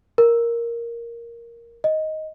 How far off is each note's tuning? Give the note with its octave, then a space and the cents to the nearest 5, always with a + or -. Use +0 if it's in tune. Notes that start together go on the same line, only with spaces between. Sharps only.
A#4 +5
D#5 +10